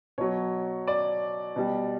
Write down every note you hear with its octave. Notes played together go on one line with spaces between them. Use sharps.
B2 F#3 C#5
D5
B2 G3